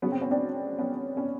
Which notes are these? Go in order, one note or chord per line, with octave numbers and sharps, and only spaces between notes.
C#3 F#3 B3 C#4
C4
B3 C#4
C4 D4
B3 C#4
B3 C#4